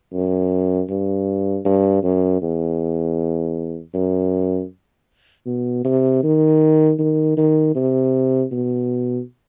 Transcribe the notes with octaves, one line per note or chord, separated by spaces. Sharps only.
F#2
G2
G2
F#2
E2
F#2
B2
C3
D#3
D#3
D#3
C3
B2